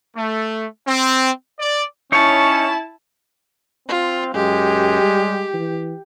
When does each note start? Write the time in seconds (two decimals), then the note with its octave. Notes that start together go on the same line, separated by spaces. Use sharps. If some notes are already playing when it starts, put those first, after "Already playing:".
0.16 A3
0.86 C4
1.59 D5
2.12 C#4 D#4 E4 C#5 A5
3.88 C4 F4
4.34 F#2 G#3 G4
5.02 G3
5.54 E3